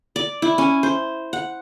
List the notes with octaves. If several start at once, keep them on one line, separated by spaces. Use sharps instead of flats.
D5
E4
C#4
C5
F#5